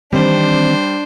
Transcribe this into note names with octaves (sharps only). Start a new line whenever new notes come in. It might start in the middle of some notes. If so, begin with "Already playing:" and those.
D#3 E3 G3 C4 D4 C5